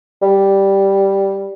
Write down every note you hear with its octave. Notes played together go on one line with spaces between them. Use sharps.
G3